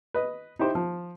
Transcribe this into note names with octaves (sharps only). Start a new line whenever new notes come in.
B4 D#5
D#4 E4 G4 C5
F3